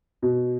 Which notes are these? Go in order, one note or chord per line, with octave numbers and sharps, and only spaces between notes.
B2